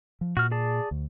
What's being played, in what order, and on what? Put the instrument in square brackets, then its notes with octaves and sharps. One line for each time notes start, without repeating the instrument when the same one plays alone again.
[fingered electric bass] F3
[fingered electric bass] A#2 [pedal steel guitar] F#4 F6
[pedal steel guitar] G#4 D5 A5
[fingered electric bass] D2